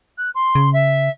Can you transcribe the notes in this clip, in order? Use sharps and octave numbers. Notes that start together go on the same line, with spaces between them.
F#6
C6
C#3
E5